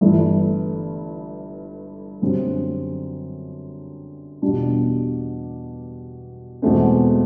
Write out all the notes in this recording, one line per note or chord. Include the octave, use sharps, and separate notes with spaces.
G1 G2 E3 A3
F#2 D3 G3 C4
E2 B2 G3 D4
E1 E2 B2 A3 C4